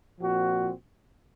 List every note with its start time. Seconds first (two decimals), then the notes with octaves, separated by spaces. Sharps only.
0.19 A#2 F3 C4 F#4